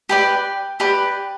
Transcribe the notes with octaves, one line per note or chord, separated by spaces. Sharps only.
G4 B4 D5 G5
G4 B4 D5